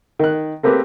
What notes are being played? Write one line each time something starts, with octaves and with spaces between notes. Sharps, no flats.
D#3 F#6
A3 A#3 C4 G4 G#4 B4